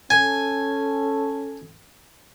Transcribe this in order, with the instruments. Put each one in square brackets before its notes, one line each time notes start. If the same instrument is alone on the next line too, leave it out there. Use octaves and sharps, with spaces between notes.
[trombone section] C#4 A4 [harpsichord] G#5